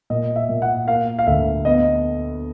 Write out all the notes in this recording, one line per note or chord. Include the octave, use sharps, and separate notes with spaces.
A#2 D#5
E5
A#2
F#5
A#3 F5
F5
D2 E5
B3 D#5